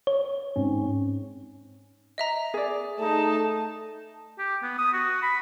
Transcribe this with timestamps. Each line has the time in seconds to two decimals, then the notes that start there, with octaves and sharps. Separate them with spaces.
0.07 C#5
0.56 G#2 C4 C#4
2.18 D#5 E5 A#5
2.54 G#4 D5
3.00 A3 D#4 A5
4.38 G4
4.63 B3
4.78 D#6
4.93 F#4
5.22 B5